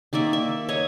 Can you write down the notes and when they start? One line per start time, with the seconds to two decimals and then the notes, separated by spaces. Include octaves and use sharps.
0.13 D#3 A#3 D5 E5
0.33 E5
0.68 C#5 D#5 E5